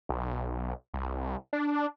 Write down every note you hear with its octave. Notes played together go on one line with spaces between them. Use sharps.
B1
C2
D4